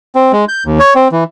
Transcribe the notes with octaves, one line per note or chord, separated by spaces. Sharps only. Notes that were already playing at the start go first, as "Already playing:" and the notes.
C4
G#3
G6
D#2
C#5
C4
E3